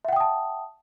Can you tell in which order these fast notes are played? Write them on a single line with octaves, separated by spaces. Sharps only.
E5 F#5 G5 D#6 A5